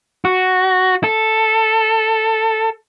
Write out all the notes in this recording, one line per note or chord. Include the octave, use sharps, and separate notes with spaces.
F#4
A4